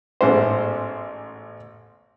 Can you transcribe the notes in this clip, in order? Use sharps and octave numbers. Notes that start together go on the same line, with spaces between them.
A1 G#2 B2 C#4 E4 C5